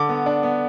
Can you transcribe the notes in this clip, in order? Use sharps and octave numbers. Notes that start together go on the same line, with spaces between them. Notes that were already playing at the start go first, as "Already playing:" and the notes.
Already playing: D3 D6
B3
D4
B3